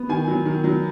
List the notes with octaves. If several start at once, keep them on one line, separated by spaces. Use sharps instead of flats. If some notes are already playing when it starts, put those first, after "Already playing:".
Already playing: B3
D#3 G#5
F#3
D#3
F#3